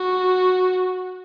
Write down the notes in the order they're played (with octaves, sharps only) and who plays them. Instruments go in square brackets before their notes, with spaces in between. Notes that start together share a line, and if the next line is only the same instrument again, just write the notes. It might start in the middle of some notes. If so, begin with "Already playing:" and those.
Already playing: [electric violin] F#4